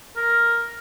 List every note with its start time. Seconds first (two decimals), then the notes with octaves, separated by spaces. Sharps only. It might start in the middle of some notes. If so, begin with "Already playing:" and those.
0.16 A#4